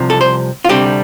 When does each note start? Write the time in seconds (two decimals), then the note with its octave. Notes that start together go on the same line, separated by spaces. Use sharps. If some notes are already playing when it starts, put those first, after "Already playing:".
Already playing: C2 C3 F3
0.10 A4
0.21 C5
0.64 F4
0.69 D2 C3 G3 D4 G4